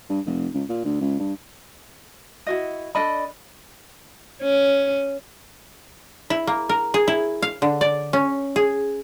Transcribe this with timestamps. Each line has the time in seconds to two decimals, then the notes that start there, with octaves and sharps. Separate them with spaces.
0.09 G2
0.26 F1
0.54 C#2
0.69 A#2
0.85 D2
1.01 C#2
1.19 G2
2.46 E4 F#4 D#5
2.95 D4 A4 D#5 B5
4.42 C#4
6.30 E4
6.47 A#3
6.69 A#4
6.94 G#4
7.08 E4
7.42 F5
7.62 D3
7.81 D5
8.13 C#4
8.56 G#4